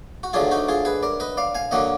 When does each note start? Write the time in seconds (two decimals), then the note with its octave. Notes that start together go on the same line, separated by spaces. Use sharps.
0.23 F#4
0.33 D2 D3 F#3 D4 F4 G#4
0.51 D#4 F#4
0.69 F4 G#4
0.85 G#4 B4
1.03 A#4 D5
1.20 B4 D#5
1.37 D5 F5
1.55 F5 G#5
1.71 D3 F#3 A#3 D#5 F#5